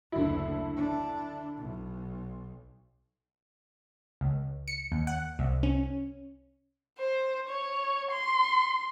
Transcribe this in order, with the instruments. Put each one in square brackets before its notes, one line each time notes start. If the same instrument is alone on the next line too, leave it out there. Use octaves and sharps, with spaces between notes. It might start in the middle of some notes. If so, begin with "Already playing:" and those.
[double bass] F#1 D2 [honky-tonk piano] D3 E4
[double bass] D4
B1
[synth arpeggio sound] C#2
C#7
D#2
F#5
C2
C#4
[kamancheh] C5
C#5
C6